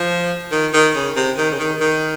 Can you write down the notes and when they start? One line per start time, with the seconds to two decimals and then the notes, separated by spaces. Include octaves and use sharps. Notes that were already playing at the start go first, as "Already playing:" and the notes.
Already playing: F3
0.52 D#3
0.74 D#3
0.95 C#3
1.16 C3
1.38 D#3
1.54 C#3
1.59 D#3
1.81 D#3